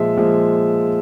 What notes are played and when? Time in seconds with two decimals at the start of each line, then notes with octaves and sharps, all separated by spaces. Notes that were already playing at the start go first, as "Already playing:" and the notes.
Already playing: A#2 F3 G#3 E5
0.17 A#2 F3 G#3